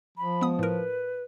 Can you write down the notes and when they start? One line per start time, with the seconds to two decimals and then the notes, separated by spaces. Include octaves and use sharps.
0.18 F3 B5
0.41 G#3 B3 D#6
0.59 A2 A#4 B4